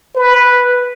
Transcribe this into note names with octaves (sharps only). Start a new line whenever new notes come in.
B4